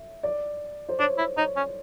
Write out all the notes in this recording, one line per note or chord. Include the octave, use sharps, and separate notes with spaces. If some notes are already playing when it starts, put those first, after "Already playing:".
Already playing: E5
D5
C5
D4 C#5
E4
D#4 C#5
C#4